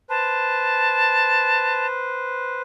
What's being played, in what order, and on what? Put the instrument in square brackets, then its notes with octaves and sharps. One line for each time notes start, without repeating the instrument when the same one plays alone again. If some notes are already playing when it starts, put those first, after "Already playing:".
[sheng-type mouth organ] B4 C5 [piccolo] A5